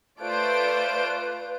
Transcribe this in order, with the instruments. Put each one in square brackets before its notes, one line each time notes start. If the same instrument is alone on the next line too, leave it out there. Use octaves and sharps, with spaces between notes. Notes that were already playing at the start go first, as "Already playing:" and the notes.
[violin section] A3 D5 D7 [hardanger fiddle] F4 [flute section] B4 F#6 [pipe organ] C5